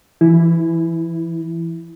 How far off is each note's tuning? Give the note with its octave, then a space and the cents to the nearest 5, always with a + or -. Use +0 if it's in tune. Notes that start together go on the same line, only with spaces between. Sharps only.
E3 +25 E4 -5